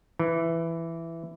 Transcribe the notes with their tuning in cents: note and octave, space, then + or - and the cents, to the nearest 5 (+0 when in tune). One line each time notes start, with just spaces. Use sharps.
E3 +10